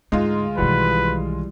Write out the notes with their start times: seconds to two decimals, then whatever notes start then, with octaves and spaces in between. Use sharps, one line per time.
0.12 D2 G#2 G#3 D#4 F4
0.58 B1 D#3 E3 G3 F#4 B4